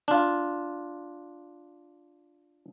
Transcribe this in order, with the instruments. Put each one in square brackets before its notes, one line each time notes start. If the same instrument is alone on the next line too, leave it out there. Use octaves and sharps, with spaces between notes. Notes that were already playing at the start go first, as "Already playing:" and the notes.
[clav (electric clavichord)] D4 F4